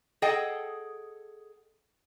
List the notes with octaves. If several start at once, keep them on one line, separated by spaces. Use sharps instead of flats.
G#4 A4 D#5 F#5 G5